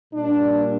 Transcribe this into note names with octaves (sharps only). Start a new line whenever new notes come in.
A#2 G3 A#3 D4